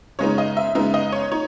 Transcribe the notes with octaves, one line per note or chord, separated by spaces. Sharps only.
C#3 G#3 B3 D#4 C#5
D#5
E5
C#3 G#3 B3 D#4 E5
D#5
C#5
D#4 C#5